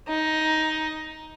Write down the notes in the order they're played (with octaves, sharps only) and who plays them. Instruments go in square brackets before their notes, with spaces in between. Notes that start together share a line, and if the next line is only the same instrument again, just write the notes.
[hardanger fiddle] D#4